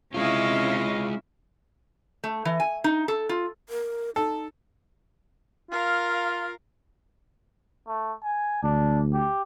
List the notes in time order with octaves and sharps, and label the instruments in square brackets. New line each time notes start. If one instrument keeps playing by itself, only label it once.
[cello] C3 E4 [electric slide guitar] G#3 F4 [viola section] C#4 D#5 F5
[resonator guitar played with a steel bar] A3
E3
G#5
D#4
A4
F4
[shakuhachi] A#4
[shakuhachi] D#4 [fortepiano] A4
[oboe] F4 [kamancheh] A#4 F5
[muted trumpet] A3
G#5
[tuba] D2 [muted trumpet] D4
[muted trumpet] G4